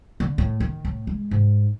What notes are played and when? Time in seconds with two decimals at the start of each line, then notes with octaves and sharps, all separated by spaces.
0.20 D3
0.38 A2
0.60 D#3
0.85 A2
1.07 G#3
1.31 G#2